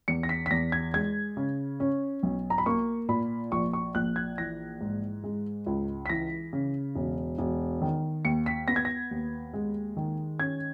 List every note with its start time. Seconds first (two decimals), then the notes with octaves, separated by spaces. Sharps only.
0.08 E2 C#7
0.23 A#6
0.29 B6
0.46 B6
0.51 E2 A#6
0.72 G#6
0.94 G#3 G#6
1.37 C#3
1.80 C#4
2.23 B1
2.50 A#5
2.58 B5
2.66 A#3 C#6
3.09 A#2 B5
3.52 A#1 C#6
3.73 C#6
3.95 A#1 F#6
4.16 G#6
4.38 E3 A#6
4.81 G#2
5.24 G#3
5.66 C#2
6.06 B6
6.10 E3 A#6
6.53 C#3
6.95 E1
7.39 E1
7.82 D#3
8.24 D#2 C#7
8.46 B6
8.68 B3 A#6
8.76 G#6
8.85 A#6
9.11 D#2
9.54 G#3
9.97 D#3
10.40 C#4 G#6